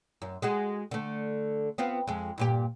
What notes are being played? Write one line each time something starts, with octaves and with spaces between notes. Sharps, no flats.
F#2
G#3 F#4 G#4
D3 A3
B3 C4 F4
F2 G#3
G2 A#2 G4